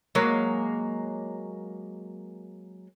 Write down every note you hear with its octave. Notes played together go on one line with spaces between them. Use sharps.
F#3 G#3 A#3